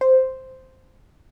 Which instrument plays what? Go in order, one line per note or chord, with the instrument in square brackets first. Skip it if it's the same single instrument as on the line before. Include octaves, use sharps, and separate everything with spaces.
[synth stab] C5